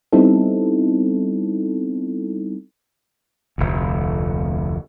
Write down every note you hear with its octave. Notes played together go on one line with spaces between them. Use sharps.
G3 B3 C4 D#4 E4 A4
F1 D2